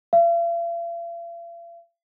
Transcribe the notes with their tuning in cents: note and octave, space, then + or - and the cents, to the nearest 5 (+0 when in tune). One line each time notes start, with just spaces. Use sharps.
F5 -45